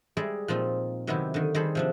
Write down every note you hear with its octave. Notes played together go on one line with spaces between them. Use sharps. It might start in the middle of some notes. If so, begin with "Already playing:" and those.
G3 G#3 G#4 D5 E5
A#2 F3 C4 D#4 F4
C3 D#3 F#3 B3 E4 G4
D3 D#3
D#3 G3 G#4 A4 C5 B5
C3 F3 D4